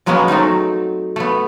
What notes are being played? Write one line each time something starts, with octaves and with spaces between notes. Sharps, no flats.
F#3 G#3 A#3 B3 C#4
F#3 A3 C4 D#4
A3 B3